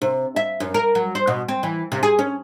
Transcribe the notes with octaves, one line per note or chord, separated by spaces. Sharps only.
C3
E5
F#2
A#4
F#3
C5
B2
C4
E3
C3
G#4
C#4